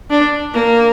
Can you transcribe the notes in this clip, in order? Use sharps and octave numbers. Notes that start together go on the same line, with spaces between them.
D4
A#3